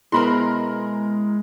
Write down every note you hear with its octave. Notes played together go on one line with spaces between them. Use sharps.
B2 G#3 B3 E4 A#4 C5 B5 C6